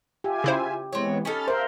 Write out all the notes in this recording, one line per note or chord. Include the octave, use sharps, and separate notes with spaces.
F4 G4 E5 G#5
C#3 E4 C5
E3 G#3 B3 C4 C#5
C#4 D#4 A4 B5 F6 A6
D4 A#4 C5 E5 F5